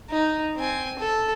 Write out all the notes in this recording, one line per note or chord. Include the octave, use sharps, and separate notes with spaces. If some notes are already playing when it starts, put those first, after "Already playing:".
D#4
C4 G#5
A4